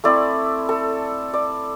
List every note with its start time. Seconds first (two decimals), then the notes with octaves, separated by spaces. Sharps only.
0.04 A3 C4 E4 D5
0.69 A4
1.34 D5